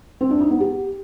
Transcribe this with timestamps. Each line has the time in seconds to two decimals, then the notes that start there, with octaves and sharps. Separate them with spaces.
0.21 C4
0.31 D4
0.40 D#4
0.50 B3
0.60 G4